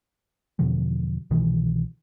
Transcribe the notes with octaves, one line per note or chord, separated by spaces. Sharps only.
E2 B2 D3 F3
C2 B2 D#3 E3